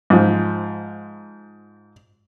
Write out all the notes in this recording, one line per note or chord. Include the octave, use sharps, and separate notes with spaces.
G#2 F3